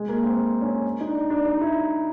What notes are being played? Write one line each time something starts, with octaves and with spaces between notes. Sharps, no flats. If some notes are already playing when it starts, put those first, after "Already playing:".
Already playing: G#3
A#3
C4
C#4
D#4
D4
D4
D#4
E4